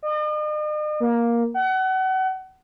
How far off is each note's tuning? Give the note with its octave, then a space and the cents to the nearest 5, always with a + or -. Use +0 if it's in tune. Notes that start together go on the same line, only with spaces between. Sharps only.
D#5 -45
A#3 +10
F#5 +30